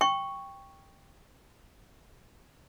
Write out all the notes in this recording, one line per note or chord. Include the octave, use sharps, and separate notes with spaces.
G5 C#6